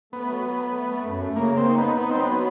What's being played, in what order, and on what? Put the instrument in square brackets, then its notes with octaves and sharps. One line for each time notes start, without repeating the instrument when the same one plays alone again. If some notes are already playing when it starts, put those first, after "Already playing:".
[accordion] A3 [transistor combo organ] B3
[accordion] F#3
F#3
A3
A3
A3
F#2
A3
[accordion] C#3 [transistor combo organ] A#3
[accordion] A#3
[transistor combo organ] C4
[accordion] D#4
[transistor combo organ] B3 [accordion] D#4
[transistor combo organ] B3 [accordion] D#4
[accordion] F#3 [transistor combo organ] C4
[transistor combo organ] B3
[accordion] F#3